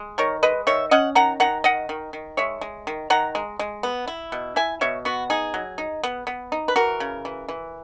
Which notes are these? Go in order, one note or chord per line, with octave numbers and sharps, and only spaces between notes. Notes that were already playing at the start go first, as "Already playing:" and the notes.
Already playing: G#3
D#3 A#4 C#5
G#3 B4 D#5
D#3 C#5 E5
C#4 D#5 F#5
D#3 F#5 A#5
D#3 F#5 A#5
D#3 D#5 F#5
D#3
D#3
G#3 C#5 E5
G#3
D#3
D#3 F#5 A#5
G#3
G#3
B3
E4
B2
E4 E5 G#5
B2 C#5 E5
B3 F#4
D#4 G#4
F#3
D#4
B3
B3
D#4
B4
E3 F#4 A#4
C#3
E3
E3